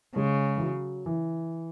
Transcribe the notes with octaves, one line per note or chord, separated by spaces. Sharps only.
C#3 G#3
E3
F#3
E3